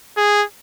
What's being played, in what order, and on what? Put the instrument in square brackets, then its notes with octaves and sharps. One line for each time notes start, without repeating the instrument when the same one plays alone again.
[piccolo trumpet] G#4